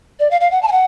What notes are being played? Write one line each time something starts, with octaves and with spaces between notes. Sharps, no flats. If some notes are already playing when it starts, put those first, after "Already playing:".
D5
F5
F5
F#5
A5
G#5
F#5